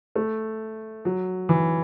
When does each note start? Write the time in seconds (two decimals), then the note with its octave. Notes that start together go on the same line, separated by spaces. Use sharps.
0.15 A3
1.05 F#3
1.49 E3